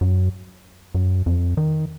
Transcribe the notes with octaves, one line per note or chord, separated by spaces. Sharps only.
F#2
F#2
F2
D#3